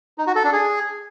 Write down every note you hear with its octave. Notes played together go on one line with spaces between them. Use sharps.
D#4
F#4
A4
D4
G#4